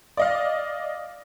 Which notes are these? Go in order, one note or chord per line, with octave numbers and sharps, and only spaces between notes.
D5 D#5 F5